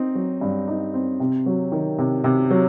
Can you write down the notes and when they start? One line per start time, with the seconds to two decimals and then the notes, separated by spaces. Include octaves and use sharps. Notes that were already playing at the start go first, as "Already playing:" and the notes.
Already playing: C4 D#4
0.15 F#3
0.41 G2
0.68 D#4
0.94 C4
1.20 C3
1.46 F#3
1.72 D#3
1.99 C3
2.24 C3
2.50 F#3